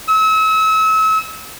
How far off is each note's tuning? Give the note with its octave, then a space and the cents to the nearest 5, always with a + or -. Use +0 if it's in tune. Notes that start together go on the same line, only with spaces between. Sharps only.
E6 -35